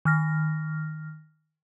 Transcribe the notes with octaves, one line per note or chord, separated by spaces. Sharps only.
D#3 F6 A#6